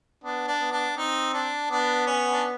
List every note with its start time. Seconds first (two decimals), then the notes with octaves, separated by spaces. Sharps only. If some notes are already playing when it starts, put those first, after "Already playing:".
0.24 B3 D4
0.48 D4
0.60 B3
0.72 D4
0.97 C4 D#4
1.34 D4
1.70 B3 D4
2.07 C#4
2.32 D4